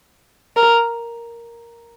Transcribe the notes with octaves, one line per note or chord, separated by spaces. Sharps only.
A#4